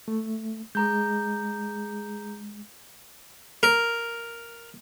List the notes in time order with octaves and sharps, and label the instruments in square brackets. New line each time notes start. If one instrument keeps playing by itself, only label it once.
[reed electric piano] A3
[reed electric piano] G#3 [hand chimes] G#4 A#5 G6
[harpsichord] A#4